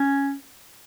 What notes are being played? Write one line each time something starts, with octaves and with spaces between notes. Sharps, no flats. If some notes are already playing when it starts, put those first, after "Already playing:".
Already playing: C#4